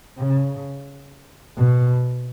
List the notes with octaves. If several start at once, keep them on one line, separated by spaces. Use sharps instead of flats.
C#3
B2